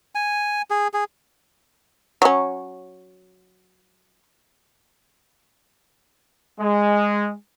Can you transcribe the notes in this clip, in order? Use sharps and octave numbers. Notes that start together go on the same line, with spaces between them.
G#5
G#4
G#4
F#3 C#4
G#3